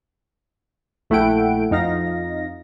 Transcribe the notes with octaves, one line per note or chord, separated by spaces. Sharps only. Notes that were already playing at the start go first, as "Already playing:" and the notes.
A#1 A3 E4 F#5 G5 D7
F2 D#4 F5 A#6